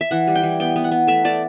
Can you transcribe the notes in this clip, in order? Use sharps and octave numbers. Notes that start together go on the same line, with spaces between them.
E5
E3 F#5
G3
G5
E3
B3 G5
B3
F#5
B3
A3 E5
A3 D5